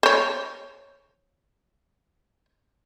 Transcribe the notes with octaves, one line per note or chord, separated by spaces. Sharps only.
C5 C#5